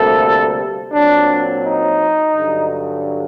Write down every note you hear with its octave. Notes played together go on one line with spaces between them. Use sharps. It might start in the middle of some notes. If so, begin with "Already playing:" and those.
Already playing: D2 C3 G3 A#3 A4
A#2 F#3 C4 D4
D#4
G2 D3 F#3